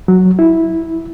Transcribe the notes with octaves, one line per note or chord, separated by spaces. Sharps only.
F#3
E4